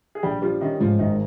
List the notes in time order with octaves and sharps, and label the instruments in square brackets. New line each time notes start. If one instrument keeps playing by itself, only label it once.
[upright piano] G#4
[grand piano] A#1 [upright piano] G3 G4
[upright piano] F3 F4 [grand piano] G3
[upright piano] D#3 D#4 [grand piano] C#4
[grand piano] G#2 [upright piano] F3 F4
[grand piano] G#1 [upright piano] D#3 D#4